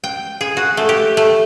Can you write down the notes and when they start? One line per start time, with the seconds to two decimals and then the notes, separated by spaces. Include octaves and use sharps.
0.04 G5
0.41 G#4
0.57 F#4
0.77 A3
0.89 G4
1.17 A3